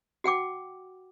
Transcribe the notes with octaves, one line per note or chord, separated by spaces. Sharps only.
F#4 F#5 G5 D6